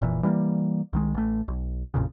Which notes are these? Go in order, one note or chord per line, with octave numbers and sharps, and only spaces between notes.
F1 A#2 E3
E3 G3 A3 A#3
C2 D#3 G#3
A1 A3
B1
A1 F2 A#2 C#3